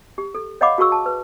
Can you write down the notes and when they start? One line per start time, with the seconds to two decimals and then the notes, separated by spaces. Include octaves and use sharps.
0.18 G4
0.35 A4
0.61 C#5 D#5 F5 F#5 B5 D6
0.78 F#4 G#4 A#4 C#6 E6
0.92 A5
1.06 B4